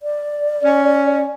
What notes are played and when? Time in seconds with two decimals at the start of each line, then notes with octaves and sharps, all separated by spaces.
0.03 D5
0.64 C#4